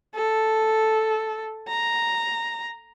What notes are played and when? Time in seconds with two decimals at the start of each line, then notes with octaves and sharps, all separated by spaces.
0.16 A4
1.68 A#5